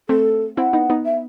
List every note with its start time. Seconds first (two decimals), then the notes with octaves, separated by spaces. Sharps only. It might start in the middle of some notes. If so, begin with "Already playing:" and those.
0.09 A3 C4 A4
0.57 C4 E4 F#5
0.73 B3 D#4
0.90 B3 D#4
1.05 E5